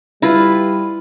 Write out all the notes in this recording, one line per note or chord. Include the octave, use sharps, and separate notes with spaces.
G3 E4 F4 B4